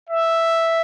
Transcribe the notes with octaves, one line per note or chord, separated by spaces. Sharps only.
E5